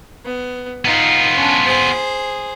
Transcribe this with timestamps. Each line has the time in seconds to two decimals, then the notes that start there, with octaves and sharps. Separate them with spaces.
0.25 B3
0.85 B3 D#4 F4
1.35 C#4 D4
1.65 G#4 C5